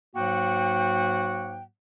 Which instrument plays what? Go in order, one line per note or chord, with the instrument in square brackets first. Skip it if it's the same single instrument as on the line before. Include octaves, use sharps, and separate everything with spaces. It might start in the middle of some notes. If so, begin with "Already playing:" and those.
[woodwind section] G#2 F#3 A#3 F#4 F#5 G5